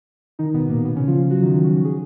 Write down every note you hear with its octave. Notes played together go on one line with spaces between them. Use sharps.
D#3 D#4
B2 B3
A#2 A#3
B2 B3
C#3 C#4
F3 F4
F#3 F#4
D#3 D#4
F3 F4
F#3 F#4
F#4
G#4